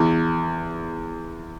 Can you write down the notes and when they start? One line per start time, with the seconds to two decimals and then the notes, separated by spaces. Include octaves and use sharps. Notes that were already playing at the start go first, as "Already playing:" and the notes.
Already playing: E2